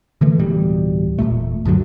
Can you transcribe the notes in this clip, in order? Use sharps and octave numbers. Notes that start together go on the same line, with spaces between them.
D3 E3 A3
D1 B2 E3 G3
E1 B1 A#2 A3
C#2 F#2 D3 F#3